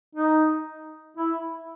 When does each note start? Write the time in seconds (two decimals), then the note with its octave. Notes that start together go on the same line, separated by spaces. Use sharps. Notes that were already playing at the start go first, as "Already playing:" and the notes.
0.15 D#4
1.17 E4